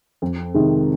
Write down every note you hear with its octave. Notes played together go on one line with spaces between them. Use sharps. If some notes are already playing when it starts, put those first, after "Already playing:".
F2
C3 D#3 G#3 D#4